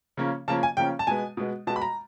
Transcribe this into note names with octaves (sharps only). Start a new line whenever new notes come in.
C#3 F3 A#3 C#4
C#3 F3 A#3 C#4 A5
G#5
C#3 F3 A#3 C#4 G5
A5
B2 G#3 B3 G#5
B2 G#3 B3
B2 G#3 B3 A5
B5
A#5